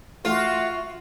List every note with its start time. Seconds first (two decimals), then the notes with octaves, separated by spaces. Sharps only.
0.25 A3 F4 F#4 E5